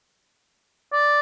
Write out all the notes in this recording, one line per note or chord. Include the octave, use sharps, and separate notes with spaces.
D5